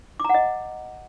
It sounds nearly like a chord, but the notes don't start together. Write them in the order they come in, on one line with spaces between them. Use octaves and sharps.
D6 A#5 F#5 D#5